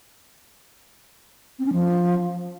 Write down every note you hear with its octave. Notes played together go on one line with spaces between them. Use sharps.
C4
C#4
F3